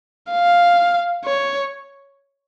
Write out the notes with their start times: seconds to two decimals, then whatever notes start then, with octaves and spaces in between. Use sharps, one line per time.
0.31 F5
1.25 C#5